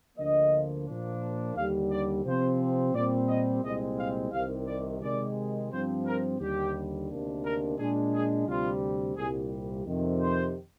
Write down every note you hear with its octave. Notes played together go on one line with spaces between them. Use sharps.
D2 D3 F3 A#3 D#5
A#2 F3 A#3 D4
D#2 D3 G3 F5
D5
C3 F3 C4 C5
A#2 G3 C4 D5
D#5
C2 A#2 G#3 C4 D#5
F5
C2 C3 D#3 F5
D5
C3 D#3 G#3 D5
G2 F3 C4 C5
A#4
D#2 D3 G3 G4
D2 C3 D#3 A#3 D4
A#4
A#2 G#3 D4 G#4
G#4
D2 C3 G3 C4 F4
C2 A#2 G3 G#4
F2 C3 D#3
C5